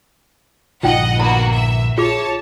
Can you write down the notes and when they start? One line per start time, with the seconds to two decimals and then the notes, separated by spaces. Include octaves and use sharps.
0.83 A#1 G2 D3 D#4 F4 D#5 F#5 G5
1.20 A#3 B3 F#4 A#5 B5
1.53 E5
1.98 F4 G#4 C#5 A5 D6